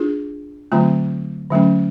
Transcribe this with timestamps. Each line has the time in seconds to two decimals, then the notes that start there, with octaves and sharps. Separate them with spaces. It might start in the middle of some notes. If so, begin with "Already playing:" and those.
Already playing: D4 F4 G#4
0.72 D3 F#3 A3 C4 F4
1.50 D3 F#3 A3 C#4